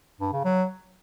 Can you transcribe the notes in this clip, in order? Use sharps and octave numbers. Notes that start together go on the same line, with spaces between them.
G2
C#3
F#3